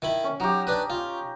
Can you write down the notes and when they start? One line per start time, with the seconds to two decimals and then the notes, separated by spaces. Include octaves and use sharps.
0.02 D#3 E4 B5
0.24 C#4
0.40 F#3 D#4 G4
0.67 D4 B4
0.90 F4